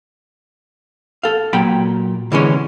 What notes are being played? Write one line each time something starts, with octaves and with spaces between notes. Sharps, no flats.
A4 F5
A#2 F#3 G5 B5
D3 E3 G#3 C#4